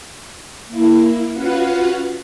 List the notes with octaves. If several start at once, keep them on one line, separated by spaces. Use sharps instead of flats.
A#3 E4
C#4 F4 F#4 B4 F5 F#5